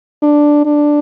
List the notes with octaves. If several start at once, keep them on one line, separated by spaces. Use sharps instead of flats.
D4
D4